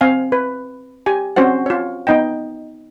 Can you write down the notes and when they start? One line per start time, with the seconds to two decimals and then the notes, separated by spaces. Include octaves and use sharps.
0.01 C4 F5 G#5
0.32 B4
1.06 G4 G#5
1.36 C4 C#4 F#4 C5 F#5
1.66 F4 C#5
2.07 B3 D#4 D#5 G5